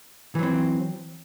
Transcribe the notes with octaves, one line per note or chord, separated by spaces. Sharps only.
E3 F#3 C4